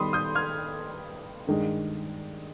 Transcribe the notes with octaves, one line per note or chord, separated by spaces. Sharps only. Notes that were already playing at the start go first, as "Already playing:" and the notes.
Already playing: D#3 G3 B3 B5 C6 D#6
D#6 G6
F6 G#6
G2 D#3 G#3